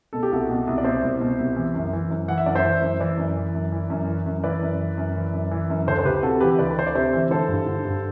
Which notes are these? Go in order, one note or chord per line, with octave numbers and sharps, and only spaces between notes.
B2 A4
G4
C2 F#4 A4
B2
C2
D5
B2 C5 E5
C2
B2
C2
E3
F#2
E3
F#2
E3 F#5
E5
F#2 D5
C5 E5
E3
F#2
E3 B4 D5
F#2
E3
F#2
E3
F#2
E3
F#2
E3 B4 D5
F#2
E3
F#2
E3
F#2
E3
F#2
D2 A4 C5
C5
D2 G4 B4
C3 F#4 A4
E3 G4 B4
D2 B4 D5
B4
D2 C5
D5
C3 C5 E5
E3
D3 A4 C5
G2
D3
G2